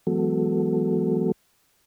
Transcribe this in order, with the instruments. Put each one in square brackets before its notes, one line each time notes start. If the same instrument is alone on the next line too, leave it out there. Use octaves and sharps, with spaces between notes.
[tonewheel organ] E3 F#3 G#3 B3 F#4 A4